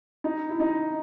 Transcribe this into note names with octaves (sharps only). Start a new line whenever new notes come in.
D#4
E4
D#4